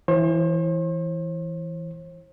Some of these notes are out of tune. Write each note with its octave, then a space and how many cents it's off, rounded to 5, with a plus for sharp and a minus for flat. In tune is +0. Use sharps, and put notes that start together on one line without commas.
E3 +0 C5 +45